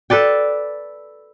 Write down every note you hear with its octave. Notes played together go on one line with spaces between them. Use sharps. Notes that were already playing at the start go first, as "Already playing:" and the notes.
A4 B4 D5 G5